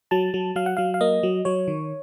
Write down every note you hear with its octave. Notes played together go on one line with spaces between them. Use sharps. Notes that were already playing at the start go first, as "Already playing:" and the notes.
F#3 A5
F#3
F#3 F5
F#5
F#3 F5
F5
A#3 D#5
F#3
F#3 C#5
D#3